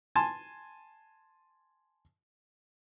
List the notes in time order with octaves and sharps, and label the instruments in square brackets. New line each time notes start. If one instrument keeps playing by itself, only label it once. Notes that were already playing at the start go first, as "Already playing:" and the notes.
[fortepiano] G#5 A5 C6